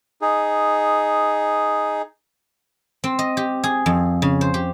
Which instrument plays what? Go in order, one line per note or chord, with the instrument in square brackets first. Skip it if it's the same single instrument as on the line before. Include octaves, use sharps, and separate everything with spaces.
[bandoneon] D#4 G#4
[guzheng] C4
D#5
G4
G#4
F2
C#3
C5
G4